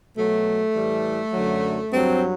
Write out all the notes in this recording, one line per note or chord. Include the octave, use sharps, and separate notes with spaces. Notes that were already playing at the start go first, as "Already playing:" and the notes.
B2 F#3 A3
A2 E3 G3
F#2 D3 F#3
G2 F#3 C4